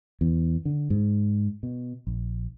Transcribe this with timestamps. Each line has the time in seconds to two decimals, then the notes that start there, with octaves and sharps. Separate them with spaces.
0.21 E2
0.65 D3
0.90 G#2
1.63 B2
2.07 A#1